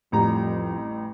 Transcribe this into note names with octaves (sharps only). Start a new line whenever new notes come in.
A1 F2 G3 A#5